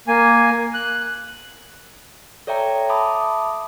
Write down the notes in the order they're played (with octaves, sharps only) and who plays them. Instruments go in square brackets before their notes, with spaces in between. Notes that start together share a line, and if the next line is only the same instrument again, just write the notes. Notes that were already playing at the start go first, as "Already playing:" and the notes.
[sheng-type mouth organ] A#3 G#5
F#6
[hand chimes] A4 C#5 D5 E5 G5 A#5
E5 A5 B5 D6 D#6